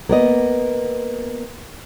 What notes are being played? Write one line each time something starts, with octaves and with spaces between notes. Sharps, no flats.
A#3 B3 D#5